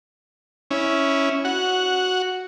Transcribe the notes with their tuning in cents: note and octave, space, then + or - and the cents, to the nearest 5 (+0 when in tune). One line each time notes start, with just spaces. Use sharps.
C#4 +0 E4 -15
F#4 +0 F#5 -10